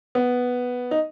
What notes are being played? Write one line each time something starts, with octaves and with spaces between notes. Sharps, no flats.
B3
D#4